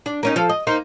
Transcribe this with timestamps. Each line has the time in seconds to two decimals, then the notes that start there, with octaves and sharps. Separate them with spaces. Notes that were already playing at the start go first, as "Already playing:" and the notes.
0.06 D4
0.23 A#3 C#4 D#4
0.36 F3 A4 F5
0.49 D#5
0.67 A#3 D#4 C5